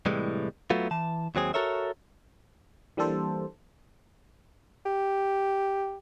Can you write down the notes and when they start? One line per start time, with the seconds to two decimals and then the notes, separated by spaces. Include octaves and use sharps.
0.06 C2 A2 E3 G3 G#3
0.70 F#3 A3 B3 F4
0.91 E3 A5
1.35 D#2 F#3 C4 G#4
1.54 F#4 A4 A#4 C#5 E5
2.97 E3 G3 A#3 D4 A4 C5
4.86 G4